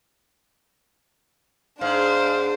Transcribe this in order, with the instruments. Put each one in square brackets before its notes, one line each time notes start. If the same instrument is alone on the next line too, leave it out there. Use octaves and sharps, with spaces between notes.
[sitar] G#2 [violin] D4 C5 [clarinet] F5